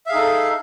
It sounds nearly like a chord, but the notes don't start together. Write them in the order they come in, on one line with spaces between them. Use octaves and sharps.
E5 F5 G#4 D#4 A4